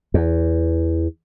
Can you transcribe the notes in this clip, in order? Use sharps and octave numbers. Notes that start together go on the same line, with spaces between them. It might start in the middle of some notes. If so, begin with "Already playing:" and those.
E2